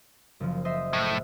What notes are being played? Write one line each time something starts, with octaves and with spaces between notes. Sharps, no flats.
F#1 F3
C5 D#5 E5
A2